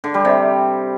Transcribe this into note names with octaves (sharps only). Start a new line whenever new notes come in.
D3
G3
C3